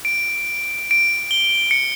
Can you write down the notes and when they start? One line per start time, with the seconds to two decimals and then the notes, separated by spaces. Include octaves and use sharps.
0.05 D7
0.91 D7
1.31 G7
1.71 C#7